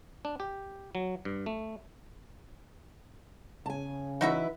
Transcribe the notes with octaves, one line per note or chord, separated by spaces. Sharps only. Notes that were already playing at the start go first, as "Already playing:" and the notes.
D4
G4
F#3
G2
A3
C#3 G#5 A5
E3 D#4 E4 F#4 B4 E5